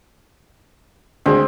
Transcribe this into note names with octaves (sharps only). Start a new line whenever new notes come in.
D2 G#3 C4